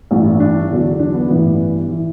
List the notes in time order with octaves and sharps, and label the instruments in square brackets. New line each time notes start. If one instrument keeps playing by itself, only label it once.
[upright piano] A1 G2 E3 G3
D4
E2 D3 F#3
D4
B3
A1 G2 E3 G3 B3
E3